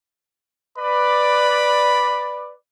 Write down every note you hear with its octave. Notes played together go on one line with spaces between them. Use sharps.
B4 D5 B5